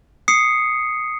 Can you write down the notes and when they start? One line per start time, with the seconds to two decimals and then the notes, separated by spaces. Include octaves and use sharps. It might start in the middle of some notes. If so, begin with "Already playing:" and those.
0.28 D#6 C7 C#7